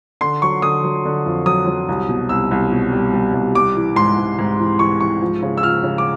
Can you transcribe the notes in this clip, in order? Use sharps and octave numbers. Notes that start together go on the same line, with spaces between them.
D3 C6
F#3 C#6
D3 D#6
F#3
D3
F2
F#3 D#6
F#3
C2
B2
C2 E6
C2
B2
G3
G3
C2
G3 D6
E3
G#2 C6
G#2
G#2
E3
E3 C#6
G#2 C#6
F3
C#3
E6
F3 F6
C#3
D6